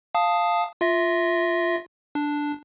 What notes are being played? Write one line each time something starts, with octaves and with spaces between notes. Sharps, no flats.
F5 A5 D#6
F4 E5 A#6
D4